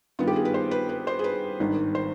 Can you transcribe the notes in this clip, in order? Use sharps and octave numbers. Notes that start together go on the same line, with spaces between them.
G2 D#3 B3 F4
G4
G#4
B4
C5
B4
B4
C5
G#4
B4
G#1 G2 D#3
C5